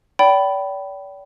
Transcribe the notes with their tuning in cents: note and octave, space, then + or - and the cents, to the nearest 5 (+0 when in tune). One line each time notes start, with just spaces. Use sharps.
D5 -40 G5 -25 B5 +0